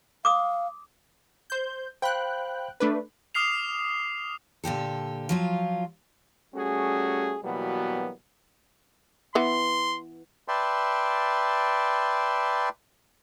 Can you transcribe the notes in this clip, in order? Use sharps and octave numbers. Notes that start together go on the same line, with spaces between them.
F5 D6 D#6
C5 G6
C5 F5 G5 B5 F#6
A3 D4 B4
D6 D#6 F6 C7 F7
A#2 D3 G4 A4
F3 F#3 F4
G3 A3 C#4 F#4 G#4
B2 E3 F#3 G3 A#3 B3
E3 B3 C6
B4 D5 E5 G5 A5 C6